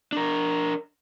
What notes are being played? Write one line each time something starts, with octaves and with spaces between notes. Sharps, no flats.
D4 A#4